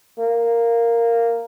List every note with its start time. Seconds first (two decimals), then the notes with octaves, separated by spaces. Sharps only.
0.18 A#3